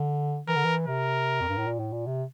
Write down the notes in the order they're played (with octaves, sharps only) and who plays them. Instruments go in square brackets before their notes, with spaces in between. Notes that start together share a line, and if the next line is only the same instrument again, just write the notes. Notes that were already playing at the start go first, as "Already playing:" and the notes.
Already playing: [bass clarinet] D3
[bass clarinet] E3 [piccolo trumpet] A#4
[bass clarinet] D3
E3
[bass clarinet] C3 [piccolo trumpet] A#4
[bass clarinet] F2
G2
A2
A#2
A2
A#2
C3